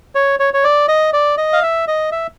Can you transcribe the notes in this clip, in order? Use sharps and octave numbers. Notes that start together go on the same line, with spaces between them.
C#5
C#5
C#5
D5
D#5
D5
D#5
F5
E5
D#5
E5